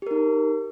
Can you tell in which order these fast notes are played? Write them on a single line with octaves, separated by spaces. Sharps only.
G4 A#4 D#4